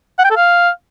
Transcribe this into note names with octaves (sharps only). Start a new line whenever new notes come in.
F#5
G5
A4
F5